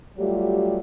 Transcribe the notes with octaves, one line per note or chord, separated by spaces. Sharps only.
F#3 G3 A3 F4 G4